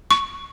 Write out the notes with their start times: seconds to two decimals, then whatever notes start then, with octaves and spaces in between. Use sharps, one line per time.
0.11 C#6